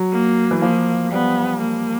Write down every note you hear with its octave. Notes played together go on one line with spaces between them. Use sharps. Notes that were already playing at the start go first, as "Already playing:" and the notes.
Already playing: F#3
A#3
E3
F3 A#3
G3 B3
A#3